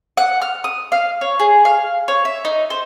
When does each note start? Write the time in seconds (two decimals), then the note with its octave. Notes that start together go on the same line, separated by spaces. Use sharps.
0.17 F#5
0.42 F6
0.64 D#6
0.92 F5
1.21 C#5
1.40 G#4
1.65 F5
2.08 C#5
2.25 E5
2.45 D#4
2.70 C5